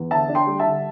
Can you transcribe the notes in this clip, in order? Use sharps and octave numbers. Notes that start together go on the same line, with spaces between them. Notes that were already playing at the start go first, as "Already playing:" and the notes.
Already playing: E2
D3 E5 A5
D4
G5 C6
G3
E5 A5
D3